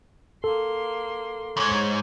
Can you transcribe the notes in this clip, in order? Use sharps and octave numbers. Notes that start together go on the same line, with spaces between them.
A#3 A4 C6
D#2 G#2 C#5 C#6